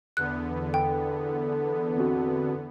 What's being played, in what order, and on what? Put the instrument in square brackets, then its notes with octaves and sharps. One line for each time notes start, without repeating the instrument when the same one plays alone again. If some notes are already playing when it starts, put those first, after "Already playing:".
[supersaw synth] E2 D3 B3 [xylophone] F#6
[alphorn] A4 [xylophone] G5
[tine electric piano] C4 F#4